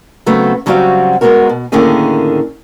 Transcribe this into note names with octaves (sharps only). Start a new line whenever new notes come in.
C#3 F#3 A3 B3 C4
C#3 F#3 G3 C4 F#4 F5
G#3 A3 B3 F#4 A#4
B2
A2 D3 D#3 A#3 C#4 G#4